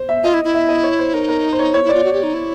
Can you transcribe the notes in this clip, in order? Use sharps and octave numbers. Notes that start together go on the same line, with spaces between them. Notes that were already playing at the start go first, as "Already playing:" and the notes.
Already playing: C5
E5
F4 D#5
E4
E4
E5
D#5
C#5
C5
D#4 A#4
A#4
C5
C#5
E4 C#5
E4 D5
F4
F#4
G4
D#4
E4